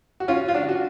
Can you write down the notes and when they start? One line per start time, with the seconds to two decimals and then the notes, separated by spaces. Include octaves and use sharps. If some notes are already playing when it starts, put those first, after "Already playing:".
0.20 F#4
0.28 C#4 F4
0.48 F4
0.54 D4 F#4
0.69 F#4